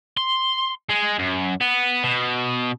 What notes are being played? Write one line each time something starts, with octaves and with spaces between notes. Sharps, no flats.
C6
G#3
F#2
B3
B2